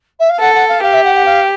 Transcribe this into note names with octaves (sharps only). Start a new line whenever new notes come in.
E5
F5
A4 F#5
F#5
F5
G4 F5
E5
F#5
F#5
F5